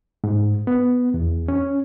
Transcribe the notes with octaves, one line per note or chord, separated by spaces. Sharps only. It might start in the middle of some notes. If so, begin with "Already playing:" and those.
G#2
B3
E2
C#4